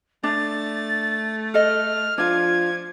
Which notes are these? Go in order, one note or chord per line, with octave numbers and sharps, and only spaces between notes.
A3 D4 A6
A4 D#5 F6
F3 D4 F4 G#6